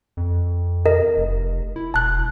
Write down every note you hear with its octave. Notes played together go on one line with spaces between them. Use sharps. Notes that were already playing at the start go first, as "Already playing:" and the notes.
F2
A#4 D#5
F1
E4
E1 A5 F#6